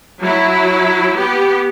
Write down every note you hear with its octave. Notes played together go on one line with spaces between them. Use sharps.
F#3 E4
B3 G4